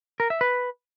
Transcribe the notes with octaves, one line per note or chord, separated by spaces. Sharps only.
A#4
E5
B4